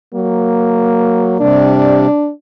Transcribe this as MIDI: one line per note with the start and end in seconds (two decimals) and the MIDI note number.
0.14 1.40 54
0.14 1.66 58
1.40 2.07 48
1.40 2.07 55
1.40 2.30 62